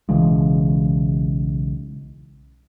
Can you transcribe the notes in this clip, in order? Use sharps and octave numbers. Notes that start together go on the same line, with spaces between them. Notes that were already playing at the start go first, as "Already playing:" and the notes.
B1 C#3 E3 G#3